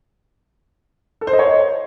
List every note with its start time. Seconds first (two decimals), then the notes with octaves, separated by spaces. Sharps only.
1.21 A4
1.27 C5
1.33 D#5
1.39 C#5